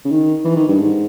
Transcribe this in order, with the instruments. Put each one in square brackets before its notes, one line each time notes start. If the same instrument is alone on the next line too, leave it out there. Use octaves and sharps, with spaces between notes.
[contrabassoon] C#3
D#3
E3
D#3
G2
G#2